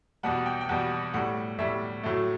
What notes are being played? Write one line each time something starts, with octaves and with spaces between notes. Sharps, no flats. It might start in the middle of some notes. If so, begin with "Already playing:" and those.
E2 B2 G3 F#5
G5
G5
E2 B2 G3 F#5
A2 G3 F#5
A2 G3 E5
A2 F#3 A3